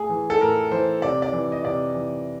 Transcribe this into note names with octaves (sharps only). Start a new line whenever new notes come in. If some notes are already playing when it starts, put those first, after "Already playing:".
Already playing: A2 G#4
E3
A4
A2 A#4
E3 C5
C3 D5
D5
E3
D#5
C3 D5
E3